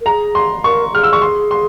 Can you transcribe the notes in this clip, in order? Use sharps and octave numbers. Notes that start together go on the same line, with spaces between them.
A#4
G#4 A#5
C6
A#4 C#6
G#4 F6
E6
C#6
C6
C6